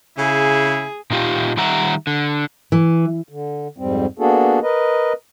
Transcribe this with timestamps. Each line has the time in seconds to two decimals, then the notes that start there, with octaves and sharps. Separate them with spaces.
0.18 C#3 E4 G#4
1.10 A#2 D#4 F4 G4
1.57 D#3 G3 E5 F#5 A#5
2.07 D3
2.72 E3
3.29 D3
3.78 F2 G#2 G3 C4
4.19 A#3 B3 D4 F#4 G#4 A4
4.63 A#4 B4 D#5